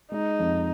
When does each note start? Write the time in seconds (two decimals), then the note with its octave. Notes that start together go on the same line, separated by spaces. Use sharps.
0.12 G#3 D#4
0.39 F2